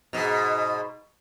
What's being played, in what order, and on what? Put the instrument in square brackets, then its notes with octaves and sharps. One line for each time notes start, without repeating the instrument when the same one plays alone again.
[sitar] G#2 B2